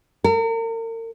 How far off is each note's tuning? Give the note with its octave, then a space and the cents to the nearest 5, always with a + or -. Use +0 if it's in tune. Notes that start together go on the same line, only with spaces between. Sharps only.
A#4 -40